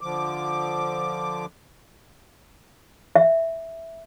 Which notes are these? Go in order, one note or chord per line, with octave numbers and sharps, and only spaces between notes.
D3 F3 D6
E5